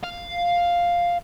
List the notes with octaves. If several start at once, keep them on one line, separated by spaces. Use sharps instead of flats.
F5